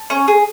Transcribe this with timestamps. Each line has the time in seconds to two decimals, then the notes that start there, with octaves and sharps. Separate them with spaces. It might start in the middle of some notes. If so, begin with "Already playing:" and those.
Already playing: A5
0.10 C#4
0.28 G#4